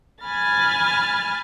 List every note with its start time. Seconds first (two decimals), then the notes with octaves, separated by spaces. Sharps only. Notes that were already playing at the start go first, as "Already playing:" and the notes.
0.24 G#5 B5 F6 A6